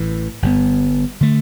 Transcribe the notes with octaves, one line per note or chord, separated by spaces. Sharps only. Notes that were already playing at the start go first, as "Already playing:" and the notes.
Already playing: A1 A2 E3
G1 G2 D3 B3
D3 A3